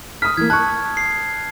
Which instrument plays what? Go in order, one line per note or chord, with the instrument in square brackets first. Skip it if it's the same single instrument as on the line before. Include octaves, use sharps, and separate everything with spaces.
[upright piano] D#6 B6 [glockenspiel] F6
[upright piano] E3 A#3 [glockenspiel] G#6
[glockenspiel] A5 [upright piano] C#6 F#6
[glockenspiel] C7